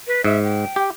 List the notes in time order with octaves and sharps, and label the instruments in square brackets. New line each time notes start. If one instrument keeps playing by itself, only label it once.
[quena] B4
[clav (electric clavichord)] G#2 [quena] E5
[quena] G5
[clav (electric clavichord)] G4